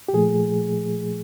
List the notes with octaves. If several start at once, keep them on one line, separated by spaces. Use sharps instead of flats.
G4
A#2 F3 A3 G#4